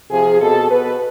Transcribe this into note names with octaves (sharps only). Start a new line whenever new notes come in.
C3 F3 G#4
B2 A4
B2 B4